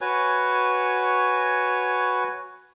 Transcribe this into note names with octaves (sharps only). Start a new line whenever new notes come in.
F#4 B4 C#5 G#5